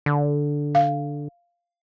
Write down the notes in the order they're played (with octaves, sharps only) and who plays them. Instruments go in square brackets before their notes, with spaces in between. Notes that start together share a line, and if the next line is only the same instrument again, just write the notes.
[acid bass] D3
[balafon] F5